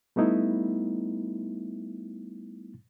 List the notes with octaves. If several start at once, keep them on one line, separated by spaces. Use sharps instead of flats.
G3 A3 B3 D#4 E4